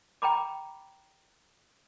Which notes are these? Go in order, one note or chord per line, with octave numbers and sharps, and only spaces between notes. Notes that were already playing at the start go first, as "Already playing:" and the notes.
G5 A#5 B5 D6